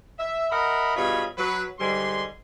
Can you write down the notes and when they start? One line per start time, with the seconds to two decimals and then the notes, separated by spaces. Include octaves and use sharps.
0.19 E5
0.51 A#4 D#5 E5 F#5 B5
0.96 G2 B2 F4 G#4 C#5 B5
1.38 F#3 B4
1.80 G#2 D3 G3 G#5 C6